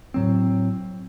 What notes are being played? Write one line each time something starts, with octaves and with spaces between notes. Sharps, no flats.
A2 F#3 C4